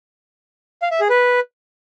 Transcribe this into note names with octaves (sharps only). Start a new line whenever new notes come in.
F5
E5
G#4
B4